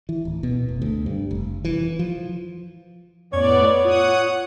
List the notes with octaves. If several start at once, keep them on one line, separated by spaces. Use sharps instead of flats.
E3
D1
B2
F1
D2
G2
F1
E3
F3
F2 A2 B3 C#5 D5
F4 F#5 D#6